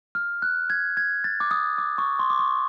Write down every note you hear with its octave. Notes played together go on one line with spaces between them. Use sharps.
F6
F#6
G#6
G#6
A6
D6
D#6
D6
C#6
C6
D6
C#6